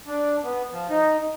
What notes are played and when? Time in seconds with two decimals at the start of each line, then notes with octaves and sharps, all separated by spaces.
0.07 D4
0.44 B3
0.73 F3
0.90 D#4